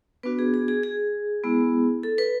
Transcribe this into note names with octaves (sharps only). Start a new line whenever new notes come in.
B3 D4 F#4 B4
G#4
G#4
G#4
G#4
G#3 B3 E4
A4
B4